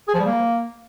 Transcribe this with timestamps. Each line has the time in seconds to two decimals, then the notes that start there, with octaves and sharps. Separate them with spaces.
0.08 G#4
0.14 F3
0.20 G3
0.26 A#3